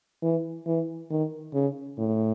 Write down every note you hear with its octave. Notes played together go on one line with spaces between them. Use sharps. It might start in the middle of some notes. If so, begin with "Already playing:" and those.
E3
E3
D#3
C#3
A2